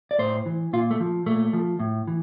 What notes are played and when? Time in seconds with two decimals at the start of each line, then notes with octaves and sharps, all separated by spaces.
0.11 D5
0.19 A2 C5
0.46 E3
0.73 A#2 F4
0.91 A3
1.00 F3
1.26 A#2 A3
1.53 F3
1.80 A2
2.07 E3